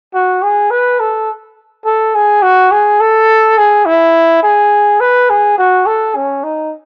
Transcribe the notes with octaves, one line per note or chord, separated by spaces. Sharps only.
F#4
G#4
B4
A4
A4
G#4
F#4
G#4
A4
G#4
E4
G#4
B4
G#4
F#4
A4
C#4
D#4